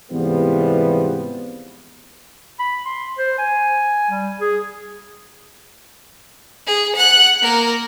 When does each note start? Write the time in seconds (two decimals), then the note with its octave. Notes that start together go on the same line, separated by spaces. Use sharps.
0.11 G#2 C3 E3 F3 G3 B3
2.59 B5
2.85 C6
3.18 C5
3.38 G#5
4.11 G3
4.40 G#4
6.67 G#4
6.96 F#5 F#6
7.42 A#3 A#4